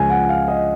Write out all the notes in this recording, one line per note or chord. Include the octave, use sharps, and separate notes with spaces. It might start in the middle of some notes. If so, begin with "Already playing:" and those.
Already playing: C#2 C#3 F3 G#5
F#5
F5
D#5